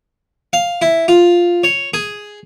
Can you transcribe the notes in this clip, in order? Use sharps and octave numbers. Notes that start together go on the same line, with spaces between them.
F5
E4
F4
C#5
G#4